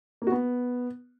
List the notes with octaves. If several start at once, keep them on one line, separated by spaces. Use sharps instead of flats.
A#3
F#4
B3